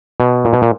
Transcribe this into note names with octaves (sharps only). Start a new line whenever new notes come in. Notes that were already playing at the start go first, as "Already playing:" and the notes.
B2
A#2
B2
A#2